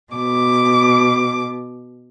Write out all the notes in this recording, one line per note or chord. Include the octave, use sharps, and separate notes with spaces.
B2 D6